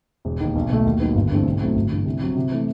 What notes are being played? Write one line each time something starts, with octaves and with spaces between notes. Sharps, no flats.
E1
D#2 D#3
B1
B2 A3
D#2
D#3 F#3 B3
G1
G2 E3 A3 C4
B1
A2 F#3 A3 C4
G1
G2 E3
C2
C3 F#3
C3
E3 A3